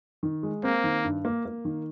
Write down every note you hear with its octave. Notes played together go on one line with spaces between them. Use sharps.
D#3
G#3
A#3 C4
D#3
G2
A#3
A#3
D#3